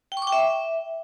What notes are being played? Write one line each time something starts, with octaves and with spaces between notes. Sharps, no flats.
G5
C#6
D6
G5
E5